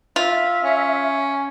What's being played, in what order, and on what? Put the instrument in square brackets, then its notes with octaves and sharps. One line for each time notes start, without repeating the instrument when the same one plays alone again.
[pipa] F4 [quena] E5
[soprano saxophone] C#4